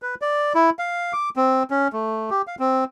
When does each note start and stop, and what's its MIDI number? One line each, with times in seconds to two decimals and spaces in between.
0.02 0.15 71
0.22 0.53 74
0.55 0.70 64
0.79 1.13 77
1.13 1.30 86
1.36 1.63 60
1.70 1.88 61
1.93 2.30 57
2.30 2.42 67
2.47 2.56 77
2.59 2.84 60